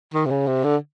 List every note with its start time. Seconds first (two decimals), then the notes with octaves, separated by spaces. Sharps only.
0.14 D#3
0.25 C3
0.30 C#3
0.47 C3
0.64 D3